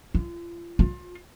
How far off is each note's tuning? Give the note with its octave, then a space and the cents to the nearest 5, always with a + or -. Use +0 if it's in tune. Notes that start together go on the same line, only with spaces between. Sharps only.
F4 -35
F4 +30